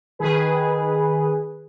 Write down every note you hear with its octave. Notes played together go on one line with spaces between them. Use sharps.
D#3 G#4 B4